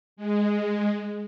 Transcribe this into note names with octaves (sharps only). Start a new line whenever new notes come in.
G#3